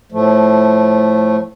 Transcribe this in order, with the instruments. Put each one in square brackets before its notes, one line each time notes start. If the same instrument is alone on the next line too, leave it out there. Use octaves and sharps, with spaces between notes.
[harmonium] A2 F3 A3